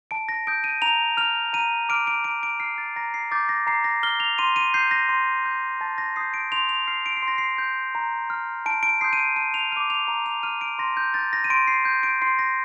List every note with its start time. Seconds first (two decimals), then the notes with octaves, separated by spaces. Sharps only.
0.11 A5 D7
0.29 A#6
0.47 D#6 G6 D7
0.64 D#7
0.82 A#5 F7
1.17 F6 F7
1.53 A#5 D#7
1.89 D6 F6 D7
2.07 D7
2.24 A#5 D7
2.43 D7
2.60 F6 C7
2.78 A6
2.96 A#5 A#6
3.14 C7
3.31 D6 G6 A6
3.49 A#6
3.67 A#5 C7
3.84 A#6
4.03 F6 G7
4.20 F7
4.38 C6 D#7
4.56 D#7
4.74 G6 C7
4.91 A#6
5.09 C6
5.46 G6
5.81 A5 A6
5.98 A#6
6.16 D#6 G6 C7
6.34 D7
6.52 C6 F7
6.69 F7
6.87 F6 C7
7.06 D7
7.17 C7
7.23 C6
7.28 A#6
7.38 C7
7.58 G6
7.95 A#5
8.30 F6
8.66 A5 D7
8.83 D7
9.01 C6 D#6 G6 C7
9.13 D#7
9.19 D7
9.36 A5 D#7
9.54 F7
9.72 D6 F6 D#7
9.90 F7
10.08 A#5
10.26 F7
10.43 F6 D#7
10.61 D7
10.79 C6 A#6
10.97 G6
11.14 G6 A6
11.33 A#6
11.44 D#7
11.50 C6 D7
11.67 C7
11.85 G6
12.03 D7
12.22 C6 C7
12.39 A#6